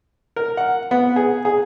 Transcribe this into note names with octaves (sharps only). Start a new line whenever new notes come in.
A#4
F#5
B3
G#4
G#4